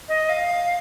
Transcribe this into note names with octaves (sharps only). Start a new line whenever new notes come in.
D#5
F5